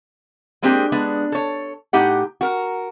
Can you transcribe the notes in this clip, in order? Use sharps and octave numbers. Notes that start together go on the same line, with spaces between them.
G#3 A#3 C4 D4 G4 G#4
G#3 B3 D4
A4 C#5
A2 D#4 G4 F#5
F#4 A#4